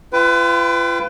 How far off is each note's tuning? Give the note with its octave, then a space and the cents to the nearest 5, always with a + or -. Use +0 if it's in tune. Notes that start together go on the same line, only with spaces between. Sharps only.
F4 -30 B4 +30 G5 +0